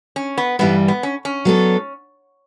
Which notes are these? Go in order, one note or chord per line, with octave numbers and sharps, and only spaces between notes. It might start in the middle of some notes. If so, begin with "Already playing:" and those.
C#4
B3
G2 E3 G3 B3
B3
C#4
C#4
F#3 B3 D4 A4